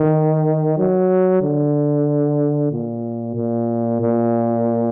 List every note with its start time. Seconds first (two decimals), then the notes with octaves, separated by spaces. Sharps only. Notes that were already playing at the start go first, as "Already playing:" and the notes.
Already playing: D#3
0.78 F#3
1.42 D3
2.71 A#2
3.35 A#2
4.00 A#2